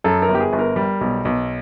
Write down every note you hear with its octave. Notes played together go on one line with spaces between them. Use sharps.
F#2 A4
A#4
G1
G4
G#4
G1
A#4
G3
B1
B1